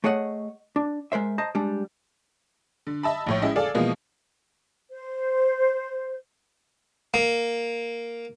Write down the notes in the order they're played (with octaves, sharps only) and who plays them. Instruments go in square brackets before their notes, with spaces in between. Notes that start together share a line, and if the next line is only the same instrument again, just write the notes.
[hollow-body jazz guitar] A3 G#4 C#5 D#5 F#5
D4
G#3 A#4 C5 E5
C5 D#5 A5 A#5
G3 G#3 D4
[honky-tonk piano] D3
D#5 E5 A5 B5
A#1 A2 C#5
G#3 C#4 E4 D#5
G#4 A4 D5 F5
B2 E3 F3 G#3 A#3
[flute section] C5
[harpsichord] A#3